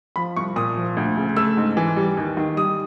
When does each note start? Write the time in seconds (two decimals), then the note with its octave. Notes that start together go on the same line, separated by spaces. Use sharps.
0.16 F3 B5
0.36 C2 C#6
0.56 A#2 D#6
0.77 F3
0.97 D2
1.17 C#3
1.37 A3 E6
1.57 G#2
1.77 E3
1.97 G3
2.17 D#2
2.37 D#3
2.57 G3 D#6